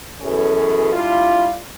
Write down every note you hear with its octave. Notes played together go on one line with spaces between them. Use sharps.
F#2 B2 E3 C#4 G#4 A4
G3 D4 E4 F4